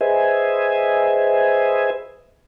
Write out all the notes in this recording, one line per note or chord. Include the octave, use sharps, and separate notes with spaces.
G#4 B4 C5 D#5 E5 G#5